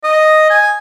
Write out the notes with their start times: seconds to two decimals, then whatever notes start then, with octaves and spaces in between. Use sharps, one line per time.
0.04 D#5
0.50 G#5